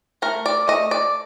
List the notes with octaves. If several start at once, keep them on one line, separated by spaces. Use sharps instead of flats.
A3 A#4
D5
A3 D#5
D5